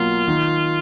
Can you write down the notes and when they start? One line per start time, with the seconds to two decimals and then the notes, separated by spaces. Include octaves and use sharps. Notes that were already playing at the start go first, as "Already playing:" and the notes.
Already playing: B2 F#3 A#3 F4
0.28 D#3